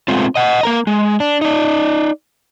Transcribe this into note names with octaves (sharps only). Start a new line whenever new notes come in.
G#3 A3 B3 C4 F4
D#5 F#5
A#3 A#4 A#5
G#3
D4
D#4 D5